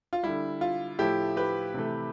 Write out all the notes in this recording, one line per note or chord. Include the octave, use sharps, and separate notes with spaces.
F4
D3 G3 E4
F4
A2 F3 A3 E4 G4
G4 B4
C3 E3 A3